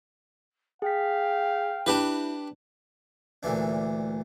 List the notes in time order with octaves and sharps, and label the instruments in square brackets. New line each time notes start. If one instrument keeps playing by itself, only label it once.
[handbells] G#4 B6 [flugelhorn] F5 [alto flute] G5
[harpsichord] D4 G4 B4 [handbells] E4
[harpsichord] D2 A#2 E3 D4